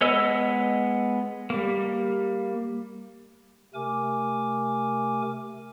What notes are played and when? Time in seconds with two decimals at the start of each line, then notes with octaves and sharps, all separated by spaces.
0.01 G#3 B3 C#5 D#5 E6
1.50 G3 A#3
3.74 C3 A3 A#4 G#5 D6